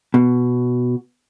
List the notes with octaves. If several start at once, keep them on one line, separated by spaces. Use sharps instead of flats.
B2